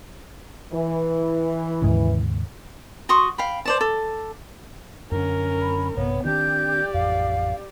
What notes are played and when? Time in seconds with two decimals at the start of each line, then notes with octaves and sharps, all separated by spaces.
0.73 E3
1.82 D#2 G#2 C#3
3.09 F#4 C6 C#6 D#6
3.38 F5 G5 B5
3.65 C5 D5 A5
3.81 A4
5.11 F#2 D3 C#4 A#4
5.61 B5
5.96 A#1 G2 C3 B3 C#5
6.25 D#3 C4 D4 G4 D5 G6
6.94 A1 F2 F5